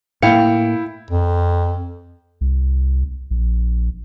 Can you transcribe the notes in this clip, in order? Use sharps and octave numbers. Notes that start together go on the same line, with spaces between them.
A2 A#3 E4 F5 G5 C#7
F2
C2
A#1